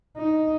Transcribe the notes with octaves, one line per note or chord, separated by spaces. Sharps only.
D#4